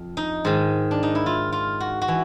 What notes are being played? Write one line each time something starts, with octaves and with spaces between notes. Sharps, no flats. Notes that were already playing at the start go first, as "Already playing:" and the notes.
Already playing: F2
D#4
G#2 D#3
D4
D#4
E4
F4
F4
F#4
F#4
E3